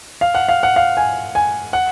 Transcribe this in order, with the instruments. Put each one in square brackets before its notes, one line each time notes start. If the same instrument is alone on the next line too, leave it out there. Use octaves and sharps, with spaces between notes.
[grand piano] F5
F#5
F5
F#5
F5
G#5
G#5
F#5